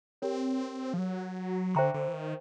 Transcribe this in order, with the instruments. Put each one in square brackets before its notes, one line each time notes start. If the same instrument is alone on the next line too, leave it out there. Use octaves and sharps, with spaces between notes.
[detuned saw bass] C4 [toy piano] G4 A#4 C#5
[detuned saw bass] F3
F#3
[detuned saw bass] D3 [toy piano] C5 E5 G5 A#5 C#6
[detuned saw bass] D3
E3
D#3